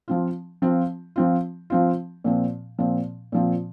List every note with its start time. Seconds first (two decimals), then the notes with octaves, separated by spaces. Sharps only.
0.08 F3 C4 F4
0.62 F3 C4 F4
1.16 F3 C4 F4
1.70 F3 C4 F4
2.24 A#2 F3 C4
2.79 A#2 F3 C4
3.32 A#2 F3 C4